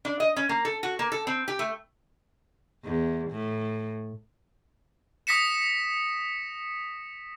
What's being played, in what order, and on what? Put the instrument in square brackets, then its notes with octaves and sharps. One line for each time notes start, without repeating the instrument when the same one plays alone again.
[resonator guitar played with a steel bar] D4
D#5
C#4
A#3
A4
F#4
A#3
A4
C4
G4
A3
[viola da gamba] E2
A2
[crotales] D#6 A#6 B6 C#7 E7